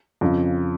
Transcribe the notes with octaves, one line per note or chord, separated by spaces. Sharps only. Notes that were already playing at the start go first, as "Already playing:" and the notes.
F2 C#3 F3